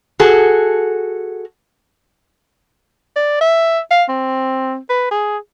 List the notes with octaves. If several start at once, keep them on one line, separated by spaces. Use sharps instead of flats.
F#4 G#4 A4
D5
E5
F5
C4
B4
G#4